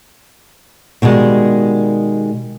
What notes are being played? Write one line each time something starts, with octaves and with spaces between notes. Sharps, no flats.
B2 D#3 G3 G#3